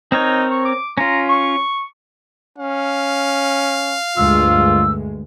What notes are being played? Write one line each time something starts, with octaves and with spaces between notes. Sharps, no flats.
C4 D#4 A#4 C#5
C#6
D6
C#4 F4 A#5
C#6
C#4 F5
D2 G2 G#3 F4 E6